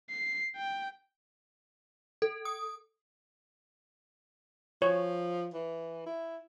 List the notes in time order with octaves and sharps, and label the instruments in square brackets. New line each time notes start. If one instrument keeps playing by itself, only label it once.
[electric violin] C7
G5
[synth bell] A4
D#6
[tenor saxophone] F3 [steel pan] C#5
[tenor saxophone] E3
E4